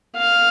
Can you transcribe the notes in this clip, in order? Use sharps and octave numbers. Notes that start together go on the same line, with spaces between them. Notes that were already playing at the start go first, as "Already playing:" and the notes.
F5